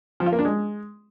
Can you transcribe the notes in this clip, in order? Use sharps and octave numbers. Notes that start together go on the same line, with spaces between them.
F3
F4
A#3
D4
G#3